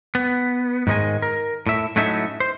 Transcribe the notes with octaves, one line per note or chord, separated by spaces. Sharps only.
B3
G#2 D#3 G#3 D#5 G#5
A#4
A2 E5
A2 F#3 A3 C#4 D#4 E5
C5